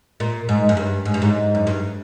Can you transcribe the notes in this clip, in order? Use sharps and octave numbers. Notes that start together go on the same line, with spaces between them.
A#2
G#2
F#2
G2
G#2
G2
G#2
F#2
G2